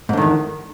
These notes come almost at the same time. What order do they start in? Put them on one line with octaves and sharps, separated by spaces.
G#2 D3 D#3 E2